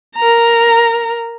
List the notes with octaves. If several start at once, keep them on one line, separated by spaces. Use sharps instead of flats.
A#4 A#5